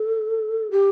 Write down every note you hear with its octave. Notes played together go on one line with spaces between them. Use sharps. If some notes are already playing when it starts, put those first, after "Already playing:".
Already playing: A4
G4